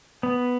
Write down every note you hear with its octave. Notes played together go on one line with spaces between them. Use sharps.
B3